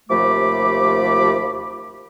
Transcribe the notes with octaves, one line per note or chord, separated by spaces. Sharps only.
D#2 C3 F3 A3 B5 D6